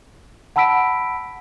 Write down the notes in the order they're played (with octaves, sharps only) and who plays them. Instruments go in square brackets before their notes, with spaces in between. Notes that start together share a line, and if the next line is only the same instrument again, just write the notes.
[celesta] F#5 A5 B5 E6 B6 D7